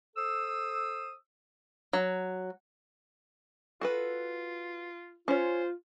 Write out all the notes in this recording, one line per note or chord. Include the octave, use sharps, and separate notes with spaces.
A4 C5 D#6 E6
F#3
F4 F#4 A4 B4
C#4 F4 C5 C#5